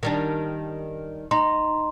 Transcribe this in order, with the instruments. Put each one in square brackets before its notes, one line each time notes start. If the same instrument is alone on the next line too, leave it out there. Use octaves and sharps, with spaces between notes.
[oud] D#3 G3 D4
[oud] D#4 [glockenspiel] A#5 C6